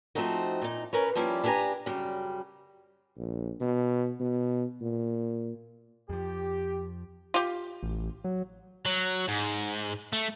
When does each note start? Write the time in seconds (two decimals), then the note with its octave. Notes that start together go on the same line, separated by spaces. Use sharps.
0.15 F3 A3 C4 D#4 F#4
0.62 A#2 D#4
0.93 C#4 A#4 B4 C#5
1.15 F3 G3 A#3 C#4 E4
1.44 D4 E4 G4 B4 G#5 A#5
1.86 F#2 C#3 G3
3.17 A#1
3.61 B2
4.20 B2
4.81 A#2
6.09 F2 F3 G4
7.34 F4 G4
7.83 A1
8.24 F#3
8.85 F#3
9.28 G#2
10.13 A3